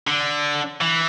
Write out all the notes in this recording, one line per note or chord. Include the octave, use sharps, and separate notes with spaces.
D3
E3